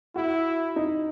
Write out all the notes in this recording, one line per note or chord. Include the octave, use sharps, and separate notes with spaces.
E4 F#4
D#4